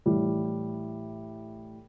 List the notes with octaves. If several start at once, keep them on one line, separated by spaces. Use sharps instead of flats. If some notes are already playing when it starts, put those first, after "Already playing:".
A2 E3 G3